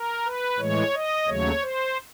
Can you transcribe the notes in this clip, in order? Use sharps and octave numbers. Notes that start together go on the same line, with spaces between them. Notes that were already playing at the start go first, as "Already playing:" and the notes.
Already playing: A#4
B4
A2 E3 G#3 C#5
D#5
D#2 C#3 F#3 A3 C#5
C5